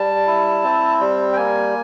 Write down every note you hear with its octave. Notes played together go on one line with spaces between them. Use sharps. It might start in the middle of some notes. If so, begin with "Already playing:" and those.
Already playing: G3 A5
E4
C4
G3
G5
A#3 G#5